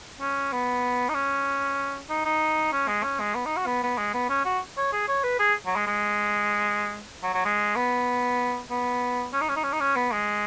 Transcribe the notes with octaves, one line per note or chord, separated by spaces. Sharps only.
C#4
B3
D#4
C#4
D#4
D#4
C#4
G#3
C#4
G#3
B3
D#4
F#4
B3
B3
G#3
B3
C#4
F#4
C#5
G#4
C#5
B4
G#4
F#3
G#3
G#3
F#3
F#3
G#3
B3
B3
C#4
D#4
C#4
D#4
C#4
D#4
C#4
B3
G#3